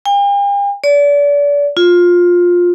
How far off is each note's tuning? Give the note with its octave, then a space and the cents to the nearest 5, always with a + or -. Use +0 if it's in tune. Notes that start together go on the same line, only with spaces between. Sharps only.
G5 +45
D5 -35
F4 +15